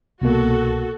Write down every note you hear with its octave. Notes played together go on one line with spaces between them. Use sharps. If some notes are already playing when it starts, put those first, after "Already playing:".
C2 B2 A#3 F#4 A4